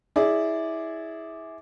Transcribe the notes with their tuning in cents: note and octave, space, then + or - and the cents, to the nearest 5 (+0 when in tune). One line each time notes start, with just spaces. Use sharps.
E4 -20 G#4 +0 D5 +0